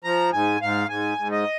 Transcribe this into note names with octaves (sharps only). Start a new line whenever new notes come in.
F3 A#5
G#2 G#5
G#2 F5
G#2 G#5
G#2
D#5